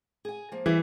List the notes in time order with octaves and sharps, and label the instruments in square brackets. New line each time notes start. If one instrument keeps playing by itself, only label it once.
[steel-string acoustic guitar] G#4 G#5
F3 A#3
[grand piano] E3 [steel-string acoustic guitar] G3 G#4 E5